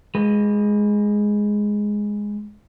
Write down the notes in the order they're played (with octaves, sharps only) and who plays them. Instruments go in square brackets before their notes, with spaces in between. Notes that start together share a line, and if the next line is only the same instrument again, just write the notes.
[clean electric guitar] G#3 B4